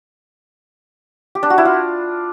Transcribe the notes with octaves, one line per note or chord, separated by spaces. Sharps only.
G4
D4
F#4
E4
F4